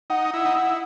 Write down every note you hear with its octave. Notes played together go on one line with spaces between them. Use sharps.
D#4 F#5
E4
D#4
E4